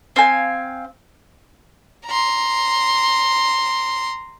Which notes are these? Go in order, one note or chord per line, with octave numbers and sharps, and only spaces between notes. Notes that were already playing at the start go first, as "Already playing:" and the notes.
C4 F5 G#5
A#5 C6